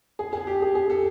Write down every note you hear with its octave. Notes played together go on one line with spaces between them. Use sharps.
G#4
G#4
G4
G#4
G#4
A4